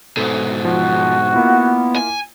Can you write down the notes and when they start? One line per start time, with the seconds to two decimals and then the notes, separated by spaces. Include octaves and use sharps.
0.17 G#2 B2 A4
0.65 F3 F#4
1.34 A#3 B3 E4 F4
1.96 G#5